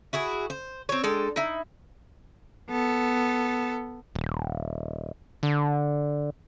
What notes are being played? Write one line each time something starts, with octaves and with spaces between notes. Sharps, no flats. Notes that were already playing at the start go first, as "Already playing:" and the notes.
E4 F#4 G#4
C5
C4 C#5
G#3 D4 A4 G5
D#4 E4
B3 A4
D#1
D3